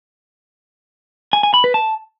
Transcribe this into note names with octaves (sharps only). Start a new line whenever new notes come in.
G#5
G#5
B5
B4
A5